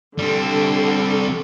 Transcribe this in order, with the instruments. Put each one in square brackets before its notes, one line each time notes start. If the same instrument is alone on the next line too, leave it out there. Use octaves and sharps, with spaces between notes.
[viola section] D3 [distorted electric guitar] G3 C4